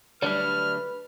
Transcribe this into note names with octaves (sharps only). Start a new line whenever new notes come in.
D3 F#3 G3 A3 D4 B4 D5 F6